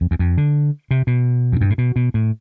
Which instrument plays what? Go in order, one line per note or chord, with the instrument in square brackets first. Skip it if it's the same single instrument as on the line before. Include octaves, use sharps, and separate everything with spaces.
[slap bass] F2
E2
F2
D3
C3
B2
F2
G2
A2
B2
B2
A2